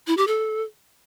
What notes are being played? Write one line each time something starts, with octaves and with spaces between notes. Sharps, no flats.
E4
G4
A4